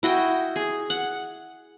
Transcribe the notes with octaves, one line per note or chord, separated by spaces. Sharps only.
E4 F#4 D#5 G5
G#4
F#5